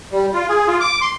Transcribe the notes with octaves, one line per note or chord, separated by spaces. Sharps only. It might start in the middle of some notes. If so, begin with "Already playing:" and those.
G3
F4
G#4
F4
D6
C6